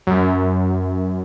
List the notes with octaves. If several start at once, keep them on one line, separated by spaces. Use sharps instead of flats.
F#2